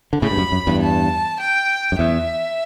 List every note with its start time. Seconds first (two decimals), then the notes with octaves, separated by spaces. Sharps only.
0.13 D3
0.22 A2 C#3 B5
0.31 G2
0.38 F#2
0.52 F#2
0.67 E2 G2
0.82 A5
1.41 G5
1.92 F#2
1.99 E2 E5